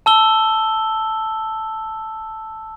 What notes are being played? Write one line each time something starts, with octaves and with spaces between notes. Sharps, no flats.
A5 E6 G7